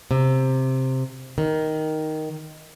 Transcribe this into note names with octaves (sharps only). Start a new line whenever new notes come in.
C3
D#3